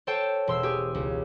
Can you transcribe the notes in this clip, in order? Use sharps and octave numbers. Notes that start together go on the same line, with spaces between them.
A4 C5 C#5 G5 A5
E1 C6 E6
G4 G#4
C#2